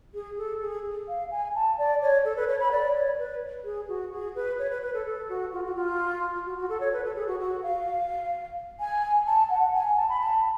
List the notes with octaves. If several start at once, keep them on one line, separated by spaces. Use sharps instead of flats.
G#4
A4
G#4
F5
G#5
A5
D5
C#5
A4
B4
C#5
B5
D5
C#5
B4
G#4
F#4
G#4
B4
C#5
B4
B4
A4
A4
F#4
F4
F#4
F4
F#4
F#4
A4
C#5
B4
A4
G#4
F#4
F#4
F5
G#5
A5
F#5
G#5
A5
B5
A5